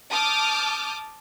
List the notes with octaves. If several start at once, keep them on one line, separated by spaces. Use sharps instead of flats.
A5 D6 D#6 F6 G6